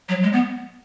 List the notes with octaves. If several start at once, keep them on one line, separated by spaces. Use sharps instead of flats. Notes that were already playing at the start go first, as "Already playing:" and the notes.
F#3
G#3
B3